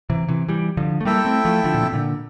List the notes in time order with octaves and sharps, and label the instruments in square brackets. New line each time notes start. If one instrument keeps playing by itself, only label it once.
[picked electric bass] C3 E3
C3 E3
E3 G3
D3 F3
A3
[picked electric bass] G3 A#3 [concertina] E4 A4 E5 G5
[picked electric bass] A3 C4
F3 A3
D3 F3
A#2
C3
A#2 D3